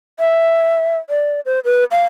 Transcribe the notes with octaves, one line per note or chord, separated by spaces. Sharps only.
E5
D5
C5
B4
F5